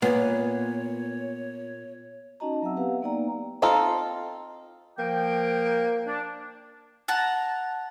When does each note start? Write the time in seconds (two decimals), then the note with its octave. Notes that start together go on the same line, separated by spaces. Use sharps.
0.02 A#2 B3 C#5
2.40 C#4 D#4 F#4 D#5 A5 A#5
2.62 F#3 C4 E5 F#5 E6
2.76 B3 G4 B4 F5 F#5
3.02 A#3 B3 D#4 D5 G5 A#5
3.62 C4 D#4 F4 A4
4.99 F3 A#3 G5
6.07 D4
7.08 F#5 A5 A#5